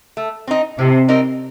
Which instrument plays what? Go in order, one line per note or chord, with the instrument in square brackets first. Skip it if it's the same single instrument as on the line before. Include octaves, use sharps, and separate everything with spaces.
[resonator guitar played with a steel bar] A3
C4 D#4
[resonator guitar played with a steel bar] A2 [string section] C3
[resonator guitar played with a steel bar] G3 C4 D#4 A#4